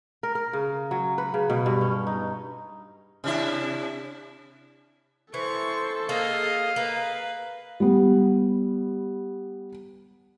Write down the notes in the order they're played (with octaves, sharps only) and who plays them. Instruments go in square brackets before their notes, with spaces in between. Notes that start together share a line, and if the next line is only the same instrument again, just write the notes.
[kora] A#4
A#4
C#3
F#3
B4
C#3
B2
G2
C#4
D#4
[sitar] C3 D4 E4
[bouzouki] E3 [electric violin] A4 [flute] C5 [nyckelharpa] C#6
[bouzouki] A#3 G#4 [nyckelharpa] D#5 F5
[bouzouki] A#3 [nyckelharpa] B4 [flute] F5
[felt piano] G3 B3